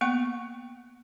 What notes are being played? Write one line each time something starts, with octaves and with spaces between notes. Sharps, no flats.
A#3 B3 F#5 C#6